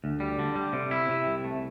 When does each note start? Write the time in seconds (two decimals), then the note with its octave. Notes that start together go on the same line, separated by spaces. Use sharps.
0.04 D2
0.20 G3
0.39 D3
0.56 G3
0.73 C3
0.91 E4
1.09 C3
1.27 C2
1.44 A3